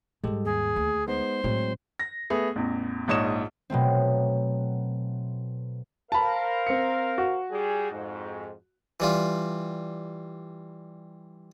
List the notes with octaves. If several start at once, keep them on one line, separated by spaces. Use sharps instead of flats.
G#2 G3 G#3 G4 A4
D#2 G#4
D2
G#3 B3 D#4 C5
A2 F#3 G#3 C4 E4
A#6
A3 B3 G#4
A1 E2
A#1 G#2 C#5 D#5 D#6 E7
B2 F#3 A3 C4
A#4 C5 F5 A5 B5
C4 C#7
F#4
G3 G#4
F2 G#2
E3 G3 F4